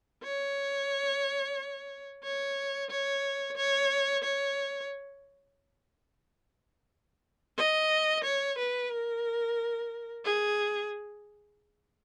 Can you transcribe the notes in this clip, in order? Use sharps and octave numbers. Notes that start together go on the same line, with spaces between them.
C#5
C#5
C#5
C#5
C#5
D#5
C#5
B4
A#4
G#4